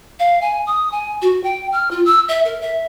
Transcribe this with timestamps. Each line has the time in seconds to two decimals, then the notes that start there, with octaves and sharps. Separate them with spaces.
0.19 F5
0.42 G#5
0.67 D#6
0.92 G#5
1.22 F#4
1.44 G5
1.72 F6
1.91 F4
2.05 E6
2.28 E5
2.45 A#4
2.61 E5